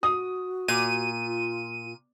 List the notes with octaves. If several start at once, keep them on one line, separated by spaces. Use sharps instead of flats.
F#4 D#6
A#2 D#7
F4